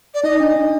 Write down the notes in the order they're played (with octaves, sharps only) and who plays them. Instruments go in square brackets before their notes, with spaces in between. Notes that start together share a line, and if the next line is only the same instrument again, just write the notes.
[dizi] D5
[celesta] D#4 [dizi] D#5
[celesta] D4
D4